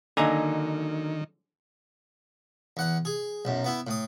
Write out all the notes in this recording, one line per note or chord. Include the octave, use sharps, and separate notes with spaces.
D3 D#3 F#3 A#3 D#4 G#5 A#5
E2 F#5
G#4
B1 F#2
B3 E4
A2 D#6